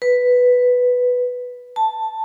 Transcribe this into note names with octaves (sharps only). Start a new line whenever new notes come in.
B4
A5